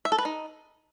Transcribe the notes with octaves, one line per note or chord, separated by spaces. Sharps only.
E5
A4
B4
D#4